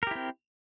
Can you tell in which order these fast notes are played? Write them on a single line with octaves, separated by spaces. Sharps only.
A#4 G4 E4 C4